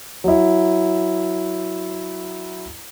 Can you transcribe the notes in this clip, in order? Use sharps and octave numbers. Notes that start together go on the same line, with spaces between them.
F#3 E4